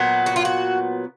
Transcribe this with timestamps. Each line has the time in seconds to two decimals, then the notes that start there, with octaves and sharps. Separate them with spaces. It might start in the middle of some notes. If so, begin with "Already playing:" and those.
Already playing: A#2 F#3 B3
0.26 F#4
0.36 F4
0.45 F#4